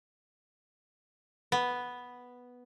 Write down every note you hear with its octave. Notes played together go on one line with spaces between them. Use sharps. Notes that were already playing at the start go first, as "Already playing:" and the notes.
B3